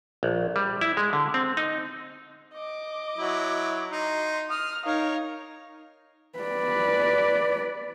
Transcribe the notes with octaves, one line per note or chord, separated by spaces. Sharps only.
A#1
G3
E4
G#3
D3
C4
D#4
D#5 D6
F#3 E4
D#4 C6
D#6 F6
D#4 A#4 C#5 F5
B4 D5